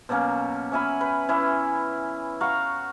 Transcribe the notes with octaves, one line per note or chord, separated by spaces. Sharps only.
B2 F#3 A#3 C#4
C#4 E5 G#5 B5
B4
E3 C#4 E4
F#4 F5 A#5 C#6